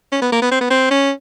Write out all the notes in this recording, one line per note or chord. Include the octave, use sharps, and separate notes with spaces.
C#4
B3
A#3
B3
C4
B3
C4
C#4